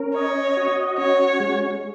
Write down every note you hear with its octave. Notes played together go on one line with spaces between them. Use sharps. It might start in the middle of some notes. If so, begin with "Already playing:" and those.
Already playing: C#4 A#4
C#5 D#5
F#4
C#4 C#5
G#3